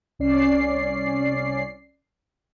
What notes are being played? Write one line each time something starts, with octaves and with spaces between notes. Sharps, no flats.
C2 C#4 D5 C7